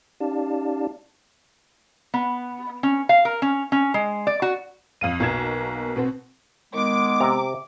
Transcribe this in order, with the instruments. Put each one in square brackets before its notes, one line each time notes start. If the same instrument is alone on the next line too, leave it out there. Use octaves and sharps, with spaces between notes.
[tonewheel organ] C#4 D#4 G4 D5 F5 A5
[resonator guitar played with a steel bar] B3
C#4
F5
A#4
C#4
C#4
G#3
D5
F#4
[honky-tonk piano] F2 F5 D#7
B1 B2 A#3 A#4 G#6 E7
B2 B3 C4
[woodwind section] D#3 G#3 B3 [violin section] D6
[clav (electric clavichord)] C3 A#5